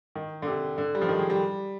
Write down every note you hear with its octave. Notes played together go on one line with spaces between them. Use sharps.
D#3
D3
C3
D3
G3
F3
D#3
G#3
G3